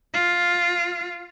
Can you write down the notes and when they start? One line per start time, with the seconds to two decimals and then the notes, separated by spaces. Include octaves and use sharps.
0.14 F4